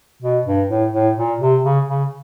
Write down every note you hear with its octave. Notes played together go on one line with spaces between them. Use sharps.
B2
G2
A2
A2
A#2
C3
C#3
C#3